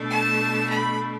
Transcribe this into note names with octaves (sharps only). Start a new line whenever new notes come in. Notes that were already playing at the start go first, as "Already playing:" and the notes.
Already playing: B2 A3 D4
A5
B5